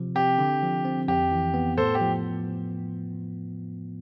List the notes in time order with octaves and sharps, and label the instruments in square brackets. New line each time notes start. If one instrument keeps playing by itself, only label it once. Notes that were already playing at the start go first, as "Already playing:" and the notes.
Already playing: [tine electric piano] C3 F3
[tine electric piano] C4 [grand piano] G4
[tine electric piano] D3
F3
C4
[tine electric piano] F2 [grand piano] G4
[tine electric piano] E3
B3
[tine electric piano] A2 [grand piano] A4 C5
[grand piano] G4
[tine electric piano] F3